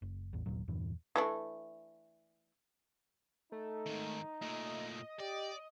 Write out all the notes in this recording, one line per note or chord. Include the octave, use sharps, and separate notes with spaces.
F#1
A1 E2
G1 D#2 A#2 F#3
E2 G2 A#2 E3
E3 A3 D4
A3 D#4
G#2 D#3
A#2 A3 D#5
G4 D5